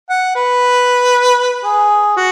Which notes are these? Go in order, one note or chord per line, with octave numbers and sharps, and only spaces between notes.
F#5
B4
G#4
F#4